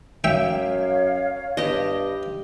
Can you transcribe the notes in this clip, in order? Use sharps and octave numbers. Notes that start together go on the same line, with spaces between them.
F#2 C#5 E5 F5 G5
G2 G4 D#5